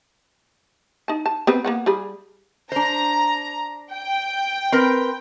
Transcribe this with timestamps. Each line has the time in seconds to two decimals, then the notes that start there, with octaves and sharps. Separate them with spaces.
1.08 D#4 A5
1.26 A5
1.47 B3 C4 B4
1.64 A#3 B3 F#5
1.86 G3 G#4 B5
2.72 D4 C5 A#5
3.92 G5
4.72 C4 A#4 B4